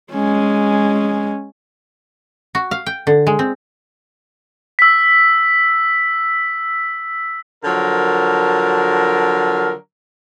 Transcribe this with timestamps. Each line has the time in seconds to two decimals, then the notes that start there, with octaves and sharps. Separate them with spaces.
0.12 G#3 C#4
2.55 F#4
2.71 F5
2.86 G5
3.07 D3
3.27 G#3
3.39 C4
4.79 E6 B6
7.65 D3 F3 F#3 A#4